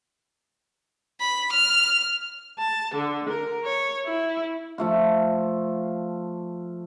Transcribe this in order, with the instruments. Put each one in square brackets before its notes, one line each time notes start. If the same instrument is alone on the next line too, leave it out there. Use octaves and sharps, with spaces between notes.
[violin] B5
F6
[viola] A5
D3
A#4
C#5
E4
[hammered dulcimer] F3 A3 F4